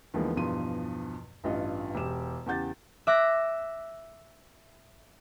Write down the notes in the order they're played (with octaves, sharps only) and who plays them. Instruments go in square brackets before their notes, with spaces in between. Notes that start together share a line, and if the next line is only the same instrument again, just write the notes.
[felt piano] D#2 D3 E3 F3 G#3 B3
E2 G2 B2 F3 C6 D#7
A1 G2 F4 D#5
E1 G4 E7
E2 C#3 G4 F#5 G6 A6
[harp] E5 D6 F#6 A#6